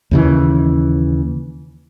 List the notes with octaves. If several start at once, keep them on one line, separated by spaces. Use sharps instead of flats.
D#2 C#3 E3